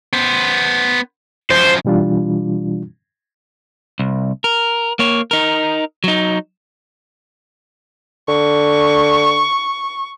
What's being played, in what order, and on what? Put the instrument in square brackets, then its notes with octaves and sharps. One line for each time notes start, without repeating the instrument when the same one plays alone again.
[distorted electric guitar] B3 C5
[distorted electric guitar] F#2 F3 [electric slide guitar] C5
[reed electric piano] B2 E3 G3 D4 F4
[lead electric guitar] C2
A#4
A#3 C#5
D#4 A#4
F#3 D#4
[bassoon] D3 [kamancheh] C#6